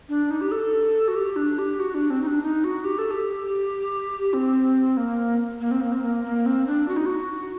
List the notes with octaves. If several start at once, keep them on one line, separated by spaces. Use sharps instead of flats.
D4
D#4
G4
A4
F#4
G4
D4
G4
F#4
D4
C4
D#4
D4
D#4
F#4
G4
A4
G4
C4
A#3
A#3
C4
A#3
C4
A#3
A#3
C4
D4
F#4
D#4
F#4